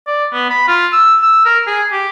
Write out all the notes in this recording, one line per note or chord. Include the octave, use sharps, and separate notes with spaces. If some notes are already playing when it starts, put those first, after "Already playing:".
D5
B3
B5
F4
E6
E6
A#4
G#4
G4